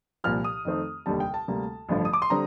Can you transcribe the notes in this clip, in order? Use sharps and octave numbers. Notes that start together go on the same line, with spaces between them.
C2 A#2 F3 F6
D#6
F2 D#3 A3 C4
F1 D#2 D3 G3 A5
G5
A5
D2 C3 G3 A#3
A1 G2 D3 F3
D#6
D6
C6
D3 G3 C4 A#5